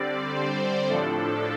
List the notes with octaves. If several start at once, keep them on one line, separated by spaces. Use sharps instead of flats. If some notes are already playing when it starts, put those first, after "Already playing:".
Already playing: D3 G3 C4 D5
C5
A2 F3 D4 A4